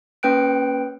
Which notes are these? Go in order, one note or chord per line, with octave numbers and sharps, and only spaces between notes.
A#3 C#4 B4 G5 F#6 D7